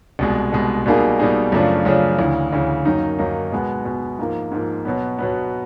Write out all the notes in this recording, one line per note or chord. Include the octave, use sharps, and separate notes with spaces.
C2 B2 G#3
C2 B2 G#3
B2 G3 A#3 D#4 G#4
B2 G3 A#3 D#4 G#4
F#2 C#3 F3 A3 D4
F#2 C#3 F3 A3 D4
D2 C#3 E3
D2 C#3 E3
F#2 D#3 F#3 A#3 D#4
F#2 D#3 F#3 A#3 D#4
B2 G#3 B3
B2 G#3 B3
G#2 F3 A#3
G#2 F3 A#3
B2 F#3 B3
B2 F#3 B3